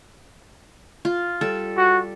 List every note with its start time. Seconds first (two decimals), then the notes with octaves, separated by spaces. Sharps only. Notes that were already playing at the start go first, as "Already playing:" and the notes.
1.05 F4
1.41 G3 A4
1.78 F#4